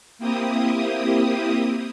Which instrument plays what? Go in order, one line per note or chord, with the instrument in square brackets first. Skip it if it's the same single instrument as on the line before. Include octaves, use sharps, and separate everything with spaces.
[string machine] A#3 C4 E4 G4 D#6